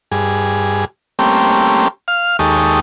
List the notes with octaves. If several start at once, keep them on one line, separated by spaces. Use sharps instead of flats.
G2 G#4
G3 A3 A#3 C4 C#4 G4
F5 F6
D#2 G#3 G4 A4 C#6 D#6